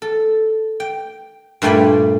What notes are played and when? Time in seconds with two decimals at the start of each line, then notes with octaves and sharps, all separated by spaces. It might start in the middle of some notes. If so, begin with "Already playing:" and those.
0.02 A4
0.80 G5
1.62 G2 A#2 A3 G5 G#5 B5